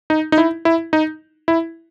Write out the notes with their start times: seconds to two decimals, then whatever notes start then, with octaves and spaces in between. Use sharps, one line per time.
0.10 D#4
0.32 D#4
0.38 E4
0.65 E4
0.93 D#4
1.48 E4